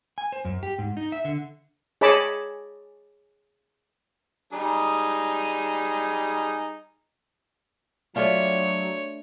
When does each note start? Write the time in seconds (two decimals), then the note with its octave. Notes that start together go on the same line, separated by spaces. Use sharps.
0.18 G#5
0.32 C5
0.45 F#2
0.63 G4
0.78 G#2
0.97 D#4
1.12 E5
1.25 D3
2.01 G#4 C#5 D#5 A5 B5 D6
4.53 G3 D#4 G#4
8.16 F#3 A3 D4 F4 C#5